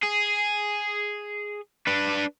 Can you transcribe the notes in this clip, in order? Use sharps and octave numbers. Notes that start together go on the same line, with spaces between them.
G#4
D4 B4